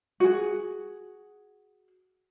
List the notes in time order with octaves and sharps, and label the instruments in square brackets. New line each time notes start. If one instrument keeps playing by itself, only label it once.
[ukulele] F#4 G#4